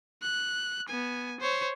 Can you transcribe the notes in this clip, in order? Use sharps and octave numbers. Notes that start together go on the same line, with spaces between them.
F#6
B3 G#5
C5 C#5